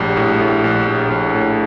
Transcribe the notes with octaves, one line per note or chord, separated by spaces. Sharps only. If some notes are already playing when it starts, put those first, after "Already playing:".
Already playing: A#1 A2 G3
A2
A2
A#1
A#1
A#1
A2